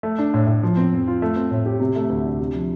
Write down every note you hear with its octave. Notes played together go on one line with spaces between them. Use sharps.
A3
D4
A2
A2
F3
C4
F2
F4
A3
C4
A2
G4
C3
A3
D2
D4
C3
F3